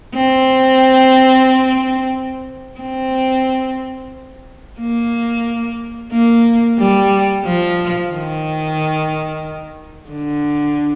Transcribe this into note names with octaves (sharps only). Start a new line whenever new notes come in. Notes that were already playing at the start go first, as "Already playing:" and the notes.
C4
C4
A#3
A#3
G3
F3
D#3
D3